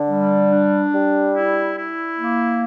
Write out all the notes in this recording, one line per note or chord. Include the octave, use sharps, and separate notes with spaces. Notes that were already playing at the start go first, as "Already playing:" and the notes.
Already playing: D3
G3
D4
G3
E4
E4
A#3